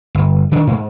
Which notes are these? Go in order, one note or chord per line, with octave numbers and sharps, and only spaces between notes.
G1
D#3 D4
G#2